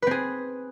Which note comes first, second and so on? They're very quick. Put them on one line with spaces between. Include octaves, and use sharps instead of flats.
B4 C4 G#4